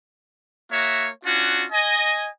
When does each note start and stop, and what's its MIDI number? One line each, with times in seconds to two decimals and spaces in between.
0.72 1.08 58
0.72 1.08 66
0.72 1.08 73
0.72 1.08 76
1.25 1.64 61
1.25 1.64 62
1.25 1.64 65
1.25 1.64 66
1.72 2.28 75
1.72 2.28 80